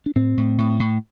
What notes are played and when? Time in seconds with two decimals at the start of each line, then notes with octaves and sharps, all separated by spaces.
0.06 D4
0.16 A2 C4
0.37 A2
0.58 A2
0.80 A2